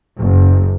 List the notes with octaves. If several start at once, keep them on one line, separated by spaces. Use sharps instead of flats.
F#1